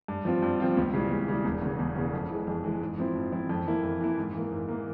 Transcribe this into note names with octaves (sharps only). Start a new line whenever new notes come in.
G2
F3 C4 F4
G2
F3 C4 F4
C#2
C#3 E3 G3
C#2
C#3 E3 G3
E1
E2 C#3
E1
E2 C#3
F2
E3 G#3
F2
E3 G#3
G#2
F3 C4 E4
G#2
F3 C4 E4
F2
E3 A#3 E4
F2
E3 A#3 E4
G#2
E3 A#3
G#2
E3 A#3